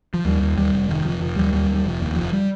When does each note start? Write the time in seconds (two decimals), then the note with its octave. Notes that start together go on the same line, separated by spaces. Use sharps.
0.14 F3
0.25 D#2 G3
0.41 D#2
0.57 D#2 G3
0.73 F1
0.89 F1 D#3
1.04 F1 F3
1.21 F1 F3
1.36 D#2 G3
1.53 D#2 G3
1.68 D#2
1.75 G3
1.84 F1 F3
2.00 D#2
2.16 F1 F3
2.33 G3